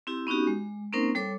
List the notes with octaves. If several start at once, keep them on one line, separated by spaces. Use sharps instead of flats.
C4 E4 G4
B3 C#4 D#4 F#4 G4
G#3
A#3 C4 C#4 D#4 A#4 C5
G3 A4 C#5 D6